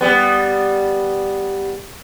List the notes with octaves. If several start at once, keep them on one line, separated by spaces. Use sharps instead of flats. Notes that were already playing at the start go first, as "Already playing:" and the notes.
G3 B3